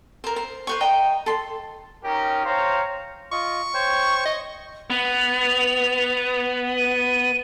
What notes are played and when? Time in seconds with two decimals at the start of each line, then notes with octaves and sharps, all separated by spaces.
0.24 A#4 C5
0.36 C5
0.67 B4 C5 C#6
0.81 D#5 G5 A#5
1.26 A4 C6
2.04 C#4 D#4 G4 A#4
2.45 C5 C#5 F5 G5 A#5
3.32 F4 D#5 C#6
3.74 C5 C#5 G5
4.25 D#5
4.90 B3 F7
6.77 D#7